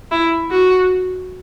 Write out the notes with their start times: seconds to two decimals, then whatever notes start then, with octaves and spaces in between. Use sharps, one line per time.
0.11 E4
0.51 F#4